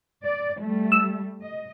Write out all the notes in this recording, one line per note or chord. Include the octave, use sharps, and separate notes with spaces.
D5
G3 A3
E6
D#5